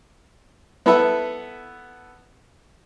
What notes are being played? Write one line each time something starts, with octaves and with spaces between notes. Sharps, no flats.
B3 E4 A4 B4 E5